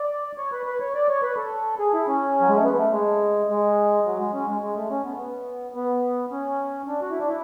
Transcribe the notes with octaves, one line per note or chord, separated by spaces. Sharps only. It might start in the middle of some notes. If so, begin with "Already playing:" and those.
Already playing: D5
C#5
B4
B4
C#5
D5
C#5
B4
A4
G#4
E4
C#4
F#3
G#3
A3
B3
A3
G#3
G#3
F#3
G#3
C#4
G#3
G#3
A3
C#4
B3
B3
B3
C#4
D4
F#4
E4
D4
E4